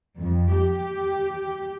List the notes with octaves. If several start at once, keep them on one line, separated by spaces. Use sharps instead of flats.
F2
G4